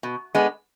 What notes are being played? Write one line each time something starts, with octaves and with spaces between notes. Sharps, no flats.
B2
G#3 B3 D4